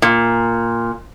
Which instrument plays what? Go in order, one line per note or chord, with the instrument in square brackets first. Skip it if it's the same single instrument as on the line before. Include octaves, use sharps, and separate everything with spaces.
[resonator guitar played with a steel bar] A#2